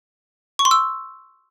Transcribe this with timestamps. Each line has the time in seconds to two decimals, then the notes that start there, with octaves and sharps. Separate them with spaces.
0.59 C#6
0.65 C6
0.71 E6